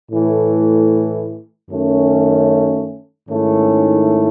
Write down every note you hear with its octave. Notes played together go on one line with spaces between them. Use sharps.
A2 E3 A3
F#2 D#3 A3 C#4
G#2 D#3 A3 C#4 E4